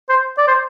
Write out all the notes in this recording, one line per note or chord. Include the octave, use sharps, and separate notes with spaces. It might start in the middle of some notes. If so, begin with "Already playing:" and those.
C5
D5
C5